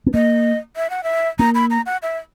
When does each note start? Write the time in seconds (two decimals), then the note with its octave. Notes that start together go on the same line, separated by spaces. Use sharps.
0.06 B3
0.14 A#3 D#5
0.77 E5
0.90 F#5
1.04 E5
1.39 A#3 A#5
1.55 B5
1.70 A#5
1.86 F#5
2.03 E5